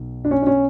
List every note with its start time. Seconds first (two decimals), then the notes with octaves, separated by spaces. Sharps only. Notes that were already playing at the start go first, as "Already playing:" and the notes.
Already playing: B1
0.25 D4
0.31 C#4
0.42 D4
0.47 C#4